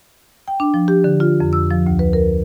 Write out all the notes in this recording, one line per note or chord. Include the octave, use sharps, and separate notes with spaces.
G5
D4
F3
G4
D3
F4
F2
E6
F3
D2
B4
A#4